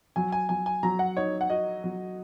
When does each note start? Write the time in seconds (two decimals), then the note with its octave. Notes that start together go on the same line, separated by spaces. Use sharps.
0.16 F#3 G#5
0.32 G#5
0.49 F#3 G#5
0.66 G#5
0.83 F#3 A#5
0.99 F#5
1.17 D#4 C#5
1.41 F#5
1.50 F#4 D#5
1.84 F#3